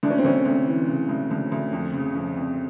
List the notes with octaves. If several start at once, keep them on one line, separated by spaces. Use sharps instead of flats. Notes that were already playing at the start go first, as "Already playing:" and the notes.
D2 D4
C#4
C4
D2 C#4
D2
E3
C#3
D2
D2
D2
F2
C#3
F2
F2